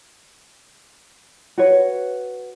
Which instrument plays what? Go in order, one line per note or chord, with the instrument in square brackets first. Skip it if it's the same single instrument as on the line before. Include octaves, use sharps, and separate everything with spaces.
[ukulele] F#4 B4 C#5